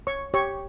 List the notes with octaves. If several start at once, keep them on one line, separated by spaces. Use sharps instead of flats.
C#5 C#6
G4 C#5 C#6